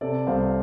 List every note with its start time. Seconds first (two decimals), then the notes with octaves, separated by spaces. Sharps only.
0.01 C3 A4 D5
0.27 C2 C5 F5